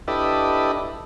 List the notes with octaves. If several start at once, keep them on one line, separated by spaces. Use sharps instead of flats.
D4 E4 G4 A4 B4 D#5